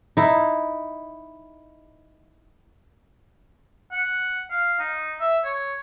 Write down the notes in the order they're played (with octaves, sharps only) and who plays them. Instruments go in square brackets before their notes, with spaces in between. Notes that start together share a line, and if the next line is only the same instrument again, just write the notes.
[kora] D#4 E4
[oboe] F#5
F5
D#4
E5
C#5